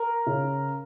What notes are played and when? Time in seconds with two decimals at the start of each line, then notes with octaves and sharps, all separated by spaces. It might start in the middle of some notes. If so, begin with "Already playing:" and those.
Already playing: A#4
0.27 C#3